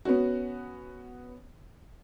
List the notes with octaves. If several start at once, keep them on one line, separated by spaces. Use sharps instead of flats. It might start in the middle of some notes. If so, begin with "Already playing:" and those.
B3 C#4 F#4